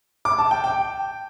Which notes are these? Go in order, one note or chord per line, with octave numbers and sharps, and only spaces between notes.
D6
A5
G5
G5